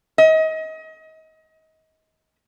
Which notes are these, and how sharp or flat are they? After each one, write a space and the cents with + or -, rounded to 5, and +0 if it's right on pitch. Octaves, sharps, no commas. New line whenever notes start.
D#5 +30